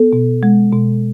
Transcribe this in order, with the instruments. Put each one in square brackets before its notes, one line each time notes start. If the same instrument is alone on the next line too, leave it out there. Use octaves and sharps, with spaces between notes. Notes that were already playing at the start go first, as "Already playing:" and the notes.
Already playing: [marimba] B3 A4
B2
G#3
B2